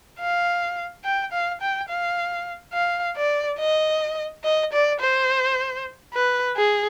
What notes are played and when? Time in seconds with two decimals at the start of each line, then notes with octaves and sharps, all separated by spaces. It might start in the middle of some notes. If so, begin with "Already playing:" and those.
0.20 F5
1.05 G5
1.32 F5
1.61 G5
1.89 F5
2.74 F5
3.17 D5
3.59 D#5
4.44 D#5
4.73 D5
5.00 C5
6.14 B4
6.56 G#4